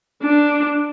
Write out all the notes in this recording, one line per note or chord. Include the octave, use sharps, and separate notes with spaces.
D4